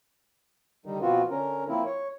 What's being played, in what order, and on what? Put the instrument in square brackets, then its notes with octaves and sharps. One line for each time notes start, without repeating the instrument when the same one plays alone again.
[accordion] D3 D#3 G3 D#4
B2 F3 B3 C4 F4 F#4
D3 C#4 A#4
F3 A#3 C4 E4
C#5